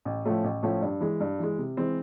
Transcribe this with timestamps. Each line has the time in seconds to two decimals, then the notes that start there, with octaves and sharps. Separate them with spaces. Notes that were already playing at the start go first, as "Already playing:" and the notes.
0.05 A1
0.25 A2 F3 A3 C#4
0.44 A1
0.63 A2 F3 A3 C#4
0.82 G2
1.01 E3 G#3
1.20 G2
1.39 E3 G#3
1.58 C3
1.77 E3 G#3 C4